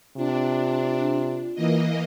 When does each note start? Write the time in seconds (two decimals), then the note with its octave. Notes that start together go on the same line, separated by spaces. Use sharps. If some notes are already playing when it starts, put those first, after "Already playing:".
0.17 C3 D4 F4
1.55 E3 A#3 D#5